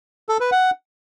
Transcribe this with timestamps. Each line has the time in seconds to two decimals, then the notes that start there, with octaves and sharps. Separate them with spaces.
0.29 A4
0.40 B4
0.52 F#5